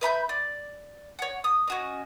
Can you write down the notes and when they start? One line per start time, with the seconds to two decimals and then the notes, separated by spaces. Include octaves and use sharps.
0.01 B4 E5 B5 G6
0.29 D5
1.19 C#5 F#5
1.44 D#6
1.68 C#4 F#4 D#5